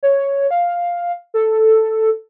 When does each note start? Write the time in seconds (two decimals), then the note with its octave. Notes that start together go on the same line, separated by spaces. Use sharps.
0.03 C#5
0.51 F5
1.34 A4